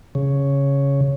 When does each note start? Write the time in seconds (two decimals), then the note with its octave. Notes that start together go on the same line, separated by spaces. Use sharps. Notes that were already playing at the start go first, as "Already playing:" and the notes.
0.15 C#3